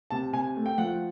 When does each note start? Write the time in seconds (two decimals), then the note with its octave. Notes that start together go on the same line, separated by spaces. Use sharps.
0.10 C3 A5
0.33 C3 G#5
0.56 A3
0.66 G5
0.78 F3 F#5